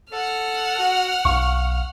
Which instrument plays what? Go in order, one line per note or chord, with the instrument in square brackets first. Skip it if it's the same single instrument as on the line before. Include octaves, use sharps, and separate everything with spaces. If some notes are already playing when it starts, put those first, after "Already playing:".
[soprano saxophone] A4 [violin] F#5 F6
[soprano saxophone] F#4
[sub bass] B1 [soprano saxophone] F5 [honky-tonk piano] C#6